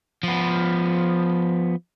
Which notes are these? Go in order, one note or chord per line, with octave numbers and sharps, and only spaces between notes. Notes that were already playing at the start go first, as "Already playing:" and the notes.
F3 B3